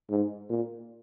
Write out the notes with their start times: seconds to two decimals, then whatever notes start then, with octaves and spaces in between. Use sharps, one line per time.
0.10 G#2
0.49 A#2